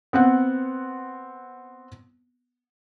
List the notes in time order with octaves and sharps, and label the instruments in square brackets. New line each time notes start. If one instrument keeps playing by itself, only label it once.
[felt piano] B3 C4 F#5